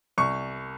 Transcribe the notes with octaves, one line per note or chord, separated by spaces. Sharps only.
C2 C#6